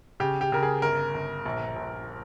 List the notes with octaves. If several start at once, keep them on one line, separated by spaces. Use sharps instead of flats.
C#3 G4
G4
C#3 A#4
G#4
G1 A#4
G1
A#1
A#1